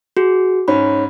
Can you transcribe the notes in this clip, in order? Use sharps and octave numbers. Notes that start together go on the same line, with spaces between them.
F#4 G#4
G#2 C#4 B5